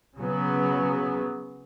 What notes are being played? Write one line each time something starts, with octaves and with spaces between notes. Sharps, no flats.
C#3 F#3 B3